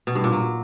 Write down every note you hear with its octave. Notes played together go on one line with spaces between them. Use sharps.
B2
G2
A#2
F#3